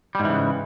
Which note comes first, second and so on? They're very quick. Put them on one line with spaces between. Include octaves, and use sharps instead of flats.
G3 G#2 E3 C#3